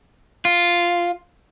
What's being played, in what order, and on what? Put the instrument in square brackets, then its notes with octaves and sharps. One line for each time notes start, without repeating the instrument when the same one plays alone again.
[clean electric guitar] F4